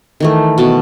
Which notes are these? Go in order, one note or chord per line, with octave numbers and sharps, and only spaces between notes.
D#3 E3 A3
B2 F#5 A5